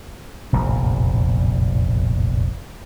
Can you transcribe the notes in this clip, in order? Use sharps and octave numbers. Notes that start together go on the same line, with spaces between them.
F1 A#1 E2 A2